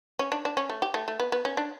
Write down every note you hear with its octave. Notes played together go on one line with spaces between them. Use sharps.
C#4
D4
D4
C#4
A3
G4
A3
A3
B3
B3
C#4
D4